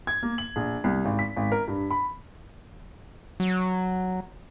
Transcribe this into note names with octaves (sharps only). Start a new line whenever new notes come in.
G#6
A#3
F#7
A#1
C2
G#1
B6
G#1
A#4
G2
B5
F#3